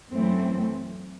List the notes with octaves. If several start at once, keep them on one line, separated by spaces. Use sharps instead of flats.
F#2 E3 A3 C4